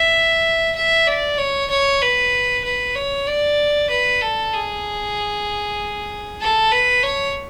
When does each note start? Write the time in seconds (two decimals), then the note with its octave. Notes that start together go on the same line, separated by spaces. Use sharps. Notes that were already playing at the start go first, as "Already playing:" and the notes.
Already playing: E5
0.76 E5
1.07 D5
1.38 C#5
1.70 C#5
2.01 B4
2.64 B4
2.95 C#5
3.27 D5
3.90 B4
4.21 A4
4.53 G#4
6.41 A4
6.72 B4
7.03 C#5